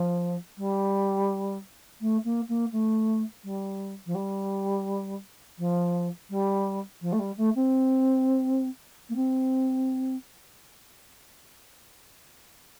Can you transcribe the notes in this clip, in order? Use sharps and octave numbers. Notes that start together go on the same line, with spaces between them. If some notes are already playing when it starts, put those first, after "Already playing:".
Already playing: F3
G3
A3
A#3
A#3
A3
G3
F3
G3
F3
G3
F3
A3
G3
A3
C4
A#3
C4